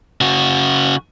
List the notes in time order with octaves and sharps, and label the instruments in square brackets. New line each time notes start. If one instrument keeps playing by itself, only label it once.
[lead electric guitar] C#3 F#4